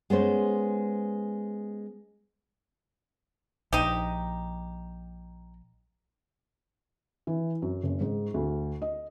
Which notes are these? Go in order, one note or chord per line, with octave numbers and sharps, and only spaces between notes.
G#3 B3 C#4 C5
A#1 D#4 G4
E3
F#2
F#1
G#2
D2
D#5